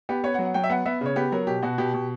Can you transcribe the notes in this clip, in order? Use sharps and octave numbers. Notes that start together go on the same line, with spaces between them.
B3 G4
B3 C#5
F#5
F#3
F#5
F#3 G5
E5
B3 F#5
B3 E5
C#3 C#5
B3 G4
F#3 A#4
B2 G4
B2 F#4
B2 G4
B2